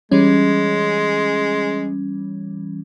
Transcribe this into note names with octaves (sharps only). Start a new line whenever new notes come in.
E3 G3 G#3 C#4